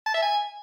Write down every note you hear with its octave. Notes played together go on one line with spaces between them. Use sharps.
A5
E5
G#5